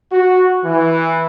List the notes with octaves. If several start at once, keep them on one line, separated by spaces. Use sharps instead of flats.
F#4
E3